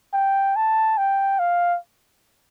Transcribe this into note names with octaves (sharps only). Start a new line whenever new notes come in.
G5
A5
G5
F5